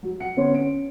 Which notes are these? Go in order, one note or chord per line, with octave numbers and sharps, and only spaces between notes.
F#3
F#5 C#7
D3 B3 C#4 C#5 C6
C#4 D7